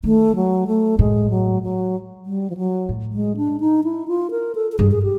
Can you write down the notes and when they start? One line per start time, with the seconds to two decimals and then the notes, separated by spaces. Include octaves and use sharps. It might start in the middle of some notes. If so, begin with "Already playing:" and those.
0.04 D#3 A3
0.36 F#3
0.67 A3
0.99 A2 G#3
1.30 F#3
1.63 F#3
2.26 G3
2.50 F3
2.57 F#3
2.89 A2
3.13 G#3
3.37 D4
3.60 D#4
3.84 E4
4.08 F4
4.31 A#4
4.55 A4
4.72 A4
4.79 G2 G#4
4.91 G#4
5.03 G4